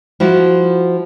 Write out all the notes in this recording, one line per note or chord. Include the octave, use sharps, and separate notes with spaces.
F3 E4 F#4